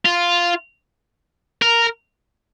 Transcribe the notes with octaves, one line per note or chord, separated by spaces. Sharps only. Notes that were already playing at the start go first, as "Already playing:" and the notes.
F4
A#4